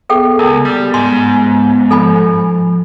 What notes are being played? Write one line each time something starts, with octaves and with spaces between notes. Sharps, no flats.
B3 G#4 A4 G5
C#2 B3 A#4
G3
G#2 C6
F3 A4 G#5 B5